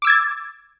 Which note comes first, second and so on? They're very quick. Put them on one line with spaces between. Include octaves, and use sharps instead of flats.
D6 E6 G#6 A6